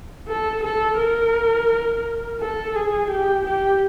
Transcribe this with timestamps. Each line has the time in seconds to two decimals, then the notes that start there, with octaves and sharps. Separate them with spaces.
0.28 A4
0.64 A4
0.99 A#4
2.40 A4
2.75 G#4
3.11 G4
3.46 G4